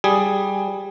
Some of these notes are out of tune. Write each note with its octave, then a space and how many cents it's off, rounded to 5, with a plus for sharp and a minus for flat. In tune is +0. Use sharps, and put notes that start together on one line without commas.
G3 +0 G#4 +0